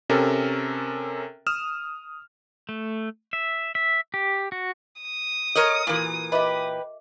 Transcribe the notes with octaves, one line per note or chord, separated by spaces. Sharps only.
C3 C#4 A4 A#4
D#6 F6 E7
A3
E5
E5
G4
F#4
D#6
A4 A#4 C#5 D#5
A#2 E3 F#4 A#4 G#5
G4 B4 D#5 E5 D6